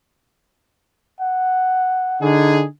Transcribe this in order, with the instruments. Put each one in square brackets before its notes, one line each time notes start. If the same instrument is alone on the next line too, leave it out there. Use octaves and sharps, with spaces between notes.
[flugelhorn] F#5
[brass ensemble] D3 D#4 G#4